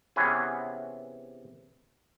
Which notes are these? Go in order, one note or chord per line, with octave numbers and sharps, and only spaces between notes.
C3 E3 B3 C#4 G#4